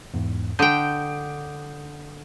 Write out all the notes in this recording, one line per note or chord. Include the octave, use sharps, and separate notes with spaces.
E2 G#2
D3 G5 D#6 G6